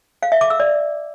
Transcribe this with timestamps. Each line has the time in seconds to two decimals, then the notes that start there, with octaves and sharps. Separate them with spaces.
0.22 F5
0.32 E5
0.41 D6
0.50 E6
0.60 D5